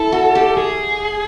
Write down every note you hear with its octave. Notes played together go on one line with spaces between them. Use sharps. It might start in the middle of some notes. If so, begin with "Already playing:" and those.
Already playing: E4 A4
F#4
G4
G#4